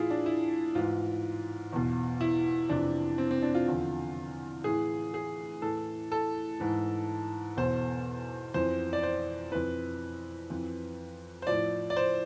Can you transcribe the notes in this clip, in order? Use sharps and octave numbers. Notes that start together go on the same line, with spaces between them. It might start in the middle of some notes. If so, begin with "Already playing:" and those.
Already playing: A2 E3 E4 F4 G#4
D4
E4
G#2 E3 F4
E2 B2
E4
F2 C3 E3 D4
C4
C4
D4
F4
E2 D3 F3
A2 E3 G#4
G#4
A2 E3 A4
A4
G#2 E3
E2 B2 C5
F2 E3 C5
D5
C5
F2 E3 B4
F2 E3
C5
A2 F3 D5
D5
C5